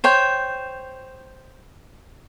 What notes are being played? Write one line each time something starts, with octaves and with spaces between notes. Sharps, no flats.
C5 C#5 G5